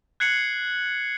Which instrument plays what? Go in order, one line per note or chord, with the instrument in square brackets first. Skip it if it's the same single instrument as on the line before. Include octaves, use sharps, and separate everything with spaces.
[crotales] F#6 G#6 C7 C#7 F#7